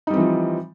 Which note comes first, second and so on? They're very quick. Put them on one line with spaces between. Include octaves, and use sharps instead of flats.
D#4 G3 C4 E3 F3